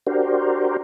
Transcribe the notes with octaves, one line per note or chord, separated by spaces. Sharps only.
D4 F#4 G4 A#4 C5